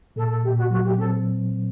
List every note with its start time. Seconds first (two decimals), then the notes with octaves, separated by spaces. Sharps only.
0.16 A#2 A4
0.30 A4
0.43 A#2 G4
0.57 F#4
0.71 F#3 F#4
0.84 G4
0.98 C4 A4